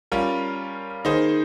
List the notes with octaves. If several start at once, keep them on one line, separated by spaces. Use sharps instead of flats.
G3 C#4 F4 A#4
D#3 A#3 D#4 G#4 C5